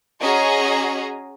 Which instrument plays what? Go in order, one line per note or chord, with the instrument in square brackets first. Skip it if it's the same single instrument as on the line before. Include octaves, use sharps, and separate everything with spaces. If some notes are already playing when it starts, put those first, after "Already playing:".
[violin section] C#4 F#4 G#4 D#5 A#5